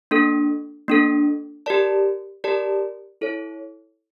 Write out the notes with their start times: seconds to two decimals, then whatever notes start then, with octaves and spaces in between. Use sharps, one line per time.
0.11 A#3 D4 A4
0.88 A#3 D4 A4
1.66 G4 A#4 D5 A5
2.44 G4 A#4 D5 A5
3.21 E4 A4 C#5